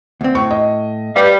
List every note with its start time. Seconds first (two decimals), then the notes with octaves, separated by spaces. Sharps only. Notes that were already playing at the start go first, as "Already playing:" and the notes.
0.21 D2 C4
0.35 A2 C#6
0.51 D#5
1.16 G3 B4 F5